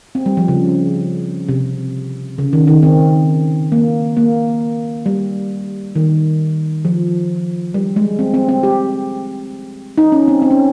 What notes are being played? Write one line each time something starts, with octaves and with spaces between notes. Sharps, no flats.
C4
G3
F3
C#3
C3
C#3
D#3
D#3
C4
A#3
A#3
G3
D#3
F3
G3
G#3
C4
C4
C4
G4
D#4
C#4
C4
C4
C#4